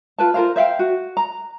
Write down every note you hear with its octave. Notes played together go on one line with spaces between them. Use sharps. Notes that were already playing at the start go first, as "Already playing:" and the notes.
F4 B4 A5
F4 A#4 C5 F5
C5 E5 F5 G5
F#4
A#5